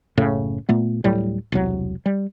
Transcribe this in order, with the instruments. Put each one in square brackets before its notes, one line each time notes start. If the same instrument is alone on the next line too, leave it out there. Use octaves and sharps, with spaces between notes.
[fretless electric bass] F#1 A2 C#3
A#2 A3 B3
D1 A2 F#3 G3
E1 C2 F#3
G3